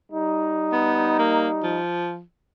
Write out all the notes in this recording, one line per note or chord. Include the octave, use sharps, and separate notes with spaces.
G3 D#4
B3
A#3
F3